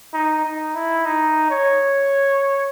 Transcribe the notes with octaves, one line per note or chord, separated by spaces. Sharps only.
D#4
D#4
E4
D#4
C#5